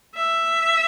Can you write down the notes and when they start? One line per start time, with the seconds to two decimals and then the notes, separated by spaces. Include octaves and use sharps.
0.15 E5